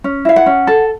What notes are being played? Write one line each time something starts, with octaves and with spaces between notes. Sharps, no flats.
C#4
E4 F5
F#5
C#4
A4